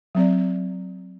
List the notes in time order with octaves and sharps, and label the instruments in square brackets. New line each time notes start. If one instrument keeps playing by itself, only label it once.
[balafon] F#3 C4 D5